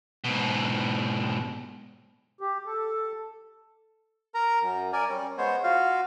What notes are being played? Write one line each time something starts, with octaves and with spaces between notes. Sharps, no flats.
G#2 B2
G4
A4
A#4 A#5
F#2
A#4 D5 G#5
G3 C#4
G#3 B3 C5 C#5
F4 F#4 F5